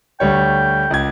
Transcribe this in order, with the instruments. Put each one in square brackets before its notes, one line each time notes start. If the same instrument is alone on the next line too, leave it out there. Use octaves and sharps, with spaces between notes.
[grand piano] D2 G3 C#5 [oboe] G5
[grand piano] C#2 G#6